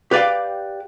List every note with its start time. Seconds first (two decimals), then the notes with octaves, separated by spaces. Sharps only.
0.11 G4 B4 D5 F5 G5